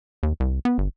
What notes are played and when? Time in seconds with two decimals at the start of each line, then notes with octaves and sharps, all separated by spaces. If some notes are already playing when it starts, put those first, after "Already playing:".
0.23 D#2
0.40 C2
0.65 B3
0.78 G1